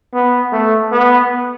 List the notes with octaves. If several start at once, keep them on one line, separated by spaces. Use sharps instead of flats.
B3
A3
B3